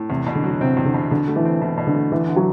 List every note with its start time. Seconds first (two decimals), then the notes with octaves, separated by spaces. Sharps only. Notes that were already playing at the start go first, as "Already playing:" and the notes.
Already playing: A2
0.09 E2 C3
0.27 B2
0.35 D3
0.44 F#3
0.61 C3 C4
0.77 E2
0.85 D3
0.94 B2
1.11 B2 D3
1.28 A3
1.36 E3
1.45 C4
1.62 B2 E3
1.78 B2
1.87 D3
1.95 A3
2.11 D2 E3
2.28 D3
2.36 F#3